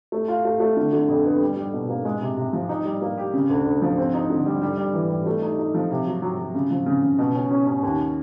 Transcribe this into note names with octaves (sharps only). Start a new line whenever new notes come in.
A3
F4
A3
A3
D3
D3
F2
B3
G3
G3
B2
A#3
G#3
C3
C3
F3
D#4
G3
A#3
G4
C#3
D2
D2
F3
C4
D#4
D3
G3
G3
G3
E3
G3
A3
D#4
D#4
F3
C3
F#3
F#3
F#3
C#3
F3
C#3
C#3
B2
C#4
C#4
C#4
D#2